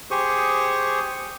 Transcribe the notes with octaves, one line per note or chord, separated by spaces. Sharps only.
G4 G#4 C5 C#6 D#6